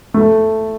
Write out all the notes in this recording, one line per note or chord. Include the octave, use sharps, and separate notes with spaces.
A3